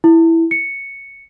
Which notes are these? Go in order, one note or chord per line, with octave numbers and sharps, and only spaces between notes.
E4
C#7